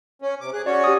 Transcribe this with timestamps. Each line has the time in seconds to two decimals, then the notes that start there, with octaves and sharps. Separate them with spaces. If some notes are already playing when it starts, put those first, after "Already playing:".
0.22 C#4
0.41 C3 D6
0.53 G#4 F#6
0.66 C#4 F#4 C#5 D5
0.84 G4 D#6